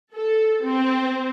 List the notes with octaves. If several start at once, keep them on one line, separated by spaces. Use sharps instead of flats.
A4
C4